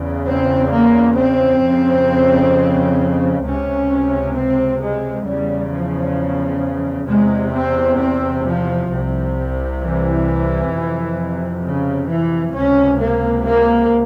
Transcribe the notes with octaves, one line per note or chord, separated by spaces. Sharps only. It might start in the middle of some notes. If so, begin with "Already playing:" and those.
Already playing: E2 C#3
C4
A#3
C4
F2 C#3
C#2 C3 C#4
C4
G#3
E2 C#3 G3
F3
E2 C3 G#3
C4
C4
F3
C2 C3
E3
F2 C3
C#3
E3
C#2 C3 C#4
A#3
A#3